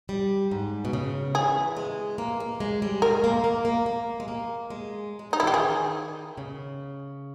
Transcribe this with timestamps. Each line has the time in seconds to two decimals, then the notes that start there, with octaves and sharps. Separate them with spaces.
0.09 G3
0.51 G#2
0.85 B2
0.93 C#3
1.35 E3 G#4
1.77 G#3
2.18 A#3
2.40 A#3
2.60 G#3
2.82 G3
3.02 G#3 A#4
3.24 A#3
3.44 A#3
3.65 A#3
3.86 A#3
4.20 G#3
4.28 A#3
4.70 G#3
5.19 G#3
5.31 G3 D#4
5.40 E4
5.43 E3 G4
5.54 D#3 G#4
6.38 C#3